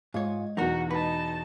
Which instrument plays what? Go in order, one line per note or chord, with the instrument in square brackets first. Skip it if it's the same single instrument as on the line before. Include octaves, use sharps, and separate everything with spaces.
[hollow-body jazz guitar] G#2 C#5 [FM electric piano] G#3 D#5 [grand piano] F4
[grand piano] E2 B2 [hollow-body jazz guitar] D#4 A#4 [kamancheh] F#4
[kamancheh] D#4 A5 [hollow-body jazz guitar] B4